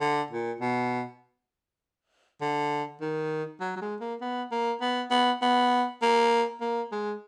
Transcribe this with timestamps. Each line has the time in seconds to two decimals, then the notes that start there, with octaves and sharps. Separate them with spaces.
0.01 D3
0.31 A#2
0.60 B2
2.41 D3
3.01 D#3
3.60 F#3
3.76 F#3
3.82 G#3
4.01 A#3
4.21 B3
4.51 A#3
4.81 B3
5.11 B3
5.42 B3
6.02 A#3
6.61 A#3
6.92 G#3